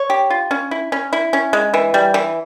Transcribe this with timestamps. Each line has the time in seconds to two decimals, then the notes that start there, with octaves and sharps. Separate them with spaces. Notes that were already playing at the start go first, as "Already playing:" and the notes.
Already playing: C#5
0.10 G4
0.30 F4
0.51 C#4
0.71 E4
0.92 C#4
1.13 E4
1.33 C#4
1.53 G#3
1.74 E3
1.94 G3
2.14 E3